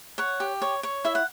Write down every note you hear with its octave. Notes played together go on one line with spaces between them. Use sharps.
C#5 F#5
G4
C#5
C#5
E4 E5
F#5